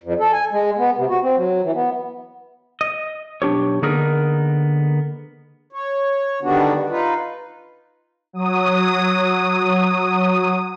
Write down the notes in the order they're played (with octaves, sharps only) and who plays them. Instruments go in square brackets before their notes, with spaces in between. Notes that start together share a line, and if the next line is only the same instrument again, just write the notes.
[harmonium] F2
A4
G#5
G#3
B3
C3
F#4
C4
F#3
E3
B3
[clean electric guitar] D#5
B1 D4 G4 C#5
D3 A#3 B3 D#4 G#4 A#4
[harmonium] C#5
D3 D#3 G3 B3 D4 F#4
D#4 F4 B4
[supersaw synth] F#3 D#6